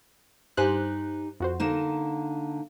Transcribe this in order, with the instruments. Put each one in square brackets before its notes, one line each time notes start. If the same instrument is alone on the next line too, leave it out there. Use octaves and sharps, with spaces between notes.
[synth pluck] G2 C5 F#6 [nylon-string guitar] D#4 G4 G#5
[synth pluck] F2 F#4 C5
[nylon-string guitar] D3 A#3 D#4 [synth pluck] E7